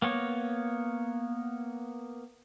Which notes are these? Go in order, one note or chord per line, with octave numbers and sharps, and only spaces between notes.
A#3 B3 C#5